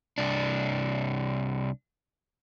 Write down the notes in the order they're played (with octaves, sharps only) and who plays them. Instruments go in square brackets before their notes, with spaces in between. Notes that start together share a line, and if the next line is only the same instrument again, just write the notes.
[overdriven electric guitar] C2 D4